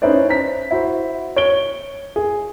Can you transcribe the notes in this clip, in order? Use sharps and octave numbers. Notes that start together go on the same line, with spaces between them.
C#4 D#4 E4 B4 C5 D5
C5 A#5 B6
E4 F#4 C5
C#5 D7 G7
G#4